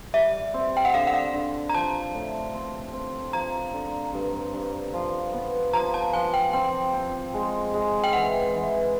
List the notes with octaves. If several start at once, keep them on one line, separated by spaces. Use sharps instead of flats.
G3 E5
C4
G5
F#5
D3 F5
F#5
F5
D3
A#5
F3 A5
A2
C4
C4
F3 A#5
D3
G2
G2
F3
B3
F3 A#5
A5
F3 G#5
G5
C4 G5
C4
G#3
G#3
G5
E3 F#5
E3